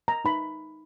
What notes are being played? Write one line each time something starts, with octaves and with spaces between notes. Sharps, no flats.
A#5
D#4 B5